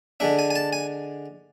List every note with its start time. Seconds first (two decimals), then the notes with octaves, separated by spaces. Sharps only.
0.20 D3 G#3 D4 E5
0.39 G#5
0.50 G#5
0.56 A5
0.73 G#5